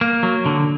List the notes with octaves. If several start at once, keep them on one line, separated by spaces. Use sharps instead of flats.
A#3
F#3
D3